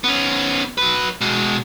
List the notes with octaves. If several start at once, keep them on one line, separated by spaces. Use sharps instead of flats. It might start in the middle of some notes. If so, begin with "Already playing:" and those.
B3 C#4
F#3 B4
B2 G#3